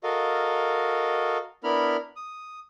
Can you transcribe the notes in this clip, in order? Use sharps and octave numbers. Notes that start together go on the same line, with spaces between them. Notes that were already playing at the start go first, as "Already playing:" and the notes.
F#4 A4 A#4 D#5 F5
B3 D4 E4 A#4 B5 F6
D#6